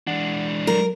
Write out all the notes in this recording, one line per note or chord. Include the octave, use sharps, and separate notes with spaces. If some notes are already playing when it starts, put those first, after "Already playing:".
E3 G#3 D4 F#5
F#3 A#4